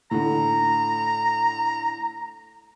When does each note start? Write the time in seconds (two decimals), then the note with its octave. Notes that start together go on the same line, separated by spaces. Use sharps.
0.11 A2 D3 A#5